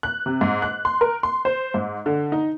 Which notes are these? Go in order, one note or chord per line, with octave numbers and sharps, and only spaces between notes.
F#6
C3
G#2
F#6
C6
A#4
C6
C5
G#2
D3
D#4